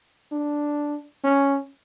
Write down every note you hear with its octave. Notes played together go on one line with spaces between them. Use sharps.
D4
C#4